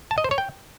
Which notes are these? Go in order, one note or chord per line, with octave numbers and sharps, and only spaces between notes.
A5
D#5
C5
C#5
G5